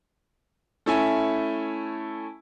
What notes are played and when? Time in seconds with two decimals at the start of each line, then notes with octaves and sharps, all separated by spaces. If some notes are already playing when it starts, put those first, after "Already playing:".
0.86 A3 C#4 E4 E5 G#5